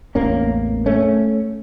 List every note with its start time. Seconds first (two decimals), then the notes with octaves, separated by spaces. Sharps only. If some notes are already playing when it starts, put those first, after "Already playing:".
0.15 A1 E2 A#3 C#4
0.86 A3 C#4